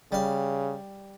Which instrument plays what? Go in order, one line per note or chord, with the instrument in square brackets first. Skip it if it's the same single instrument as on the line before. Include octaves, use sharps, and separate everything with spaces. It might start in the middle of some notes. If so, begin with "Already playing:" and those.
[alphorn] C#3 [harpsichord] G3 F5